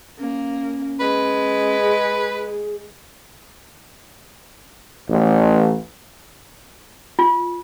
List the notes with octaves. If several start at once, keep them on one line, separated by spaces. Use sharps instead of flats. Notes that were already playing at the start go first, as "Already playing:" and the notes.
A#3 C#4
G#3 B4
G#4
A1
F4